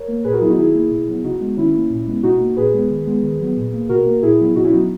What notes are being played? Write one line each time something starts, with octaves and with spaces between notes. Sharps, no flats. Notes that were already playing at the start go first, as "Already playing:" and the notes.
Already playing: A#4 C#5
A#3
A#2 G#4 B4
F#4 A#4
F#3 B3 E4 G#4
D#4 F#4
D#3 E4 G#4
A#3
B2
F#3 B3
C#3 D#4 F#4
G#3 B3
D#3 C#4 E4
A#3
A#2
G#3 B3
B2 D#4 F#4
A#3
A#2 G#4 B4
G#3 B3
D#3
G#3 B3
D#3
F#3 B3
A#2
A#3
B2 F#4 A#4
A#3
A#2 E4 G#4
F#3 B3
B2 D#4 F#4
C#4 E4
F#3 B3 D#4 F#4